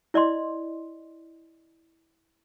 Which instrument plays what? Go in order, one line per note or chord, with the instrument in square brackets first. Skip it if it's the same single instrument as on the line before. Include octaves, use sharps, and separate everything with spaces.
[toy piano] E4 D5 D#5 C6